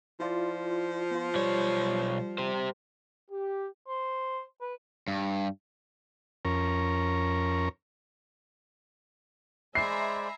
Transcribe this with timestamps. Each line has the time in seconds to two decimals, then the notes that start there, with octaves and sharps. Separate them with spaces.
0.20 F3 E4 F4 D5
1.11 B3 F4
1.35 B1 G3 C#5
2.38 G4 C5
3.30 G4
3.87 C5
4.61 B4
5.08 G2
6.45 F2 C#4 A#4
9.75 G#3 C5 D5 E5 G#5 A#5 B5 C7